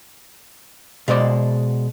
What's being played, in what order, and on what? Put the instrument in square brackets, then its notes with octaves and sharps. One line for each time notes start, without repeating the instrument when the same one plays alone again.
[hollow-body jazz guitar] B2 G#3 C5 D5